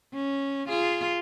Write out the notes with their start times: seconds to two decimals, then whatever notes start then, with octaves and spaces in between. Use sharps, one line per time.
0.13 C#4
0.68 F4 G#4